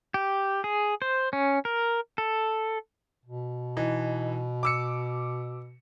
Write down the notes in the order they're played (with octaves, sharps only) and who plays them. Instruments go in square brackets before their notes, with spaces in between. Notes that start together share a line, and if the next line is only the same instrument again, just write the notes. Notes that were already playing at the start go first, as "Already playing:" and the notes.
[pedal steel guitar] G4
G#4
C5
C#4
A#4
A4
[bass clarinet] B2
[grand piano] E3 D#4
D6 E6 C#7